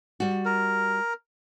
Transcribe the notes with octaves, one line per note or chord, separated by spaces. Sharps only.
G3 F#4
A#4